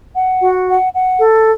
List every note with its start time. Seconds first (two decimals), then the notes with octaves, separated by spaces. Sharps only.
0.15 F#5
0.42 F#4
0.68 F#5
0.93 F#5
1.18 A4